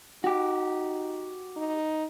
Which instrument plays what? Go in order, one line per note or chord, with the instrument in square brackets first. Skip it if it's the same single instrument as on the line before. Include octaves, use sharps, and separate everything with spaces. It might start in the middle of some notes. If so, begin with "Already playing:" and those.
[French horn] D#4 [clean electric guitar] F#4 G4
[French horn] D#4